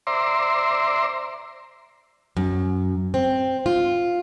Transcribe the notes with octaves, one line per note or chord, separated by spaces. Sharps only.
C5 D5 E5 A#5 C6
F#2
C4
F4